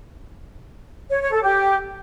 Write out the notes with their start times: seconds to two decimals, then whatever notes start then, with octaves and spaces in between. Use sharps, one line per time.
1.10 C#5
1.21 C#5
1.32 A4
1.43 G4